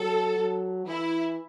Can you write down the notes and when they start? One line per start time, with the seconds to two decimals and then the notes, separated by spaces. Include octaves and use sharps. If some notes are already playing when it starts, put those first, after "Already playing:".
Already playing: F#3 A4
0.37 F#3
0.86 E3 E4